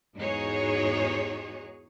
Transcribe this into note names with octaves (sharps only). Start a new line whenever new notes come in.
E2 G#2 D#4 F#4 G#4 C#5